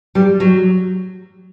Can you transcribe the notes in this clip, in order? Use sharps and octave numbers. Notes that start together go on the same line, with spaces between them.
G3
F#3